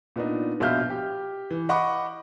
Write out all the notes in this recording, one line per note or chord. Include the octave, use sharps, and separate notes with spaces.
A#2 B3 D4 D#4
A#1 B2 E5 F5 F6 G6
G4
E3
D#5 F#5 B5 C#6 D6